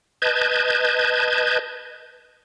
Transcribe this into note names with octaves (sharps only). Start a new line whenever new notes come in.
B4 D#5 A5 G6 G#6